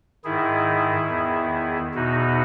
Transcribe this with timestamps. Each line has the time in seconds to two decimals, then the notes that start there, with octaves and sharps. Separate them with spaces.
0.24 G#2 D#3 E4 G#4
1.09 E2 D#3
1.95 E2 B2 D#4 F#4